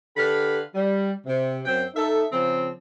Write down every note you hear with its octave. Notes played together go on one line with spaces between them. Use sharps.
D3 G4 A4 B4 F5 B5
G3
C3
F#2 C4 G5
D#4 A4 E5
C#3 F3 C4